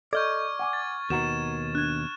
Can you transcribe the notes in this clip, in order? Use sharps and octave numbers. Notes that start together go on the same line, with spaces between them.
A4 D5 D#5 C#6 F6 G6 G#6
F#5 G#5 D6
A6
D#2 B2 D#3 F#4 F#5 A#5 E7
D4 F#6 G#6